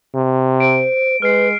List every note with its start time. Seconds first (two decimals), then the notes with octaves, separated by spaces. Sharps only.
0.14 C3
0.60 C5 D7
1.22 G#3 B4 F6 C7